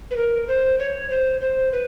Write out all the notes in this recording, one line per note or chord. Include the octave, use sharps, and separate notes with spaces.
B4
A#4
C5
C#5
C5
C5
B4